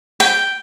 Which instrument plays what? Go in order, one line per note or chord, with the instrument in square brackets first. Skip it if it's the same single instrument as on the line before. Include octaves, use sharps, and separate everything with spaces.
[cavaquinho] G5